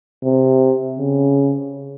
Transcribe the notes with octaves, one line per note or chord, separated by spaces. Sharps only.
C3
C#3